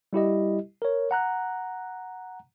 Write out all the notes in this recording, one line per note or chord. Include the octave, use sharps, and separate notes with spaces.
G3 E4 G4 D#5
A#4 C#5
F#5 A#5 F#6